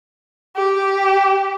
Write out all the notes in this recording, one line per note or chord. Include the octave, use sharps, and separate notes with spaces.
G4